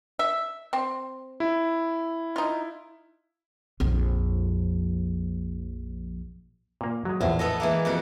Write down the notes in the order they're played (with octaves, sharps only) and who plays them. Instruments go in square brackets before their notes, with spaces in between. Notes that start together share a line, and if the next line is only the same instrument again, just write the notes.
[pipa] E5
C4
[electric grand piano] E4
[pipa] D#4 F4
[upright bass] A#1 F2
[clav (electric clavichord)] A#2 A#3
F#3 G#3
[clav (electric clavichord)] A#1 E2 [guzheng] A2
[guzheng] B3 A4 D#5
E3 G#3 A#3
F2 B2 F#4